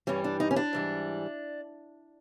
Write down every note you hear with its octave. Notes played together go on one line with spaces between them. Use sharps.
G2 E3 G3 C#4
D4
D#4
C#4
D4
G#2 E3 G3